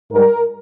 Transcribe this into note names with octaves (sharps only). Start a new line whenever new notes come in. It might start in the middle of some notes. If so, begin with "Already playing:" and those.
G#2 G3 A#4